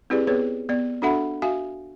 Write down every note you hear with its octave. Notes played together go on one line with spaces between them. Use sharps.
C4 E4 G4 G#4 B4 D5
B3 G#4 B4 C#5
B3 D5
D4 F#4 A4 E5 F#5 B5
F#4 E5 F5 G#5